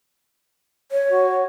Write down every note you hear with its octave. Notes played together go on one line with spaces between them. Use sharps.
C#5
F#4